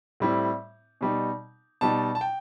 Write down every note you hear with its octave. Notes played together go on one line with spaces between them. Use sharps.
A2 G3 C4 E4
B2 G3 D#4
B2 G3 D#4 A5
A5
G5